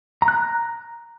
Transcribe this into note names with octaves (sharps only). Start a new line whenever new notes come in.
A#5
F#6
A#5